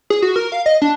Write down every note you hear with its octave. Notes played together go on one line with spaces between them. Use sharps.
G#4
F#4
A#4
F5
D#5
D4